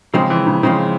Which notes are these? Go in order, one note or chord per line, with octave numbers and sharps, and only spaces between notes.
C#3 F3 G#3 C4
E3
C#3
C#3 F3 G#3 C4